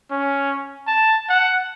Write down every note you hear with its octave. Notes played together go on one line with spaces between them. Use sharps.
C#4
A5
F#5